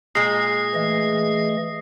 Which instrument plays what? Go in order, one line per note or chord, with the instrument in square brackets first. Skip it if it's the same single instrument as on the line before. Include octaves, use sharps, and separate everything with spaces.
[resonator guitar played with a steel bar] A#2 G#3 [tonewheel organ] G#4 [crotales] D#6 A#6 C7
[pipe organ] E3 A3 D#5